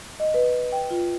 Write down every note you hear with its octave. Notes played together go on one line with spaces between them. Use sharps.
D#5
B4
G5
F4